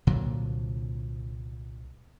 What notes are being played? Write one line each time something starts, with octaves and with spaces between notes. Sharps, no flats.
C2 A#2 D3 F#3